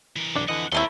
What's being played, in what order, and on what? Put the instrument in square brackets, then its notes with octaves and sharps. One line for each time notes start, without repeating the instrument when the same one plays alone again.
[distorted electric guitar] E3 A#4
[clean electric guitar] B1 B2 D4
[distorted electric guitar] F2 F#5 [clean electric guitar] D3 E3 D#5
[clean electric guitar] D#2 C4 [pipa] F#3 A3 E4 [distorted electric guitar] A4 C6